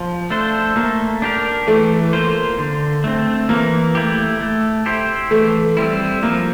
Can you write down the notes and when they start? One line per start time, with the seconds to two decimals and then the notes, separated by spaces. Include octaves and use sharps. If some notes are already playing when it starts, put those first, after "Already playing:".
Already playing: F3
0.30 A3 D4 A4 C5
0.76 A3 A#3
1.22 D4 G4 A#4
1.67 E3 A3
2.13 A#3 F4 C5
2.58 D3
3.04 A3 C4
3.49 E3 A#3
3.95 A3 E4 G4
4.41 A3
4.86 E4 G4 C5
5.31 E3 A3
5.77 G3 C4 E4
6.23 F3 A#3